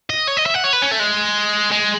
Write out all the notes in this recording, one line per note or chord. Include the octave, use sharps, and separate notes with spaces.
D#5
C#5
D#5
E5
F#5
C#5
B4
C#4
A3
G#3
G#3